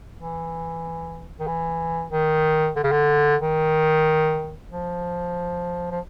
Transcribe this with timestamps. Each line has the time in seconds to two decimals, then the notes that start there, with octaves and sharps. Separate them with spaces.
0.17 E3
1.39 D#3
1.47 E3
2.11 D#3
2.76 D3
2.84 C#3
2.91 D3
3.41 D#3
4.70 F3
5.91 F3